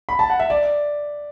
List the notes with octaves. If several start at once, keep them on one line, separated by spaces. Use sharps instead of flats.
B5
A5
F#5
E5
D5